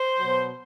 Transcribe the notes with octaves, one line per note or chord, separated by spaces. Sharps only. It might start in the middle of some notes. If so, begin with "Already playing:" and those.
Already playing: C5
B2 F#3